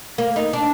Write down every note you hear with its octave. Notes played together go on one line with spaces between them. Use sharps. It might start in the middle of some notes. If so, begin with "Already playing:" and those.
A#3
D#4
D4